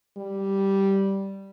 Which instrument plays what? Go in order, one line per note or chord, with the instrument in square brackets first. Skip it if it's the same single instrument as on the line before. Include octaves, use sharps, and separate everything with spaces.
[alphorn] G3